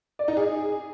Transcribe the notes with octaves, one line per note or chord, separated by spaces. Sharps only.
D5
D#4
G#4